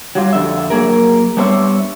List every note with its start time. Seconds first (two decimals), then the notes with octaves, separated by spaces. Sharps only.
0.15 F#3 G3 F4
0.33 F2 D3 E5
0.70 F#3 A#3 G#4 A#4
1.37 G3 B3 D4 C5 C#5 E5